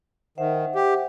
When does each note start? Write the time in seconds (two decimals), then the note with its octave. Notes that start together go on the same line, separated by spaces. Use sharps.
0.38 D#3 C5 E5 F#5
0.75 G4